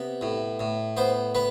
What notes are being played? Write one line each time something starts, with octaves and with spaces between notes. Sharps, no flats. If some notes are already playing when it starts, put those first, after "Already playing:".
Already playing: C3 B3
A2
A2
B3 C5
B3 B4